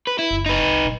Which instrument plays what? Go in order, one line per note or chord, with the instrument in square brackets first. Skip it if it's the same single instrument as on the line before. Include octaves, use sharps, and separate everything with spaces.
[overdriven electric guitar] B4
E4
[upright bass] F#1
[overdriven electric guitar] D#4 B4
[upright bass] C2
A#2 F#3